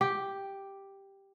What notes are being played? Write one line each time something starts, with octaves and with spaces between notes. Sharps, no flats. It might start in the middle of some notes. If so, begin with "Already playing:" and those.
G4